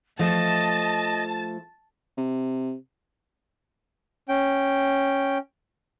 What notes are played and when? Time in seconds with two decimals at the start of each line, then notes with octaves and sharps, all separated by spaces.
0.19 F3 A3 D#5 A5
2.17 C3
4.29 C#4 G5